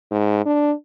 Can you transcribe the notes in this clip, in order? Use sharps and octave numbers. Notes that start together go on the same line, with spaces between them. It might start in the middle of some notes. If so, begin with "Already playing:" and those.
G#2
D4